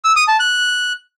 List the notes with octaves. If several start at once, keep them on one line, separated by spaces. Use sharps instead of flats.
E6
D#6
A5
F#6